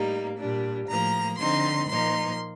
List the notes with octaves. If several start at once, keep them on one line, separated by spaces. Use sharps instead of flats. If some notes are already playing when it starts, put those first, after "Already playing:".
Already playing: A2 G3 A#3 D#4
A#2 G3 D4
A2 F3 A#3 A#5
D3 F3 C4 D#4 C6
A#2 F3 A#3 D#4 C6